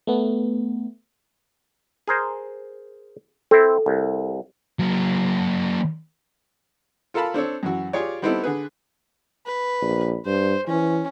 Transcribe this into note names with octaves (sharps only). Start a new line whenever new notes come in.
A3 B3
G#4 A#4 C5
C4 E4 A4
C2
F#3 A#3
F4 A4 A#4 F5 A5 B5
C4 D4 A4 C#5
F#2 E3 F#4
F4 G4 G#4 C#5 D5
G3 B3 C4 D#4 E4 A4
D3 G#4 B4
B4
A#1
G2 C5
E3 C#4